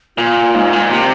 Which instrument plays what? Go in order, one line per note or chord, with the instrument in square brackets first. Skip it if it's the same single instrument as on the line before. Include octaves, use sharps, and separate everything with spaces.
[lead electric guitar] A#2 [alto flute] F4
[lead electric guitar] G#2
A#2
[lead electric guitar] C3 [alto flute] G4